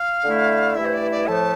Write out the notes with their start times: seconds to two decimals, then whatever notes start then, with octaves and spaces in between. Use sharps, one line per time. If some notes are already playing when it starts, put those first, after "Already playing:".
Already playing: F5
0.24 D3 A3 E4
0.75 G2 E3 A3 E4 E5
0.85 C5
0.93 D5
1.11 D5
1.27 A2 F3 A3 A5